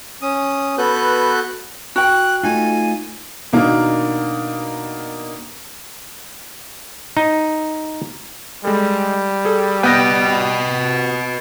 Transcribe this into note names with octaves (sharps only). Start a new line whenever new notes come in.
C#4 D#6
B3 F#4 A4 B4 F#6 G6
F#4 G5 F#6
A3 D#4 F4 G#5
B2 D#3 A#3 D4 D#4 A#4
D#4
G3 G#3 A4
G#4 A4
B3 B4 D#5 G5 F#6 A#6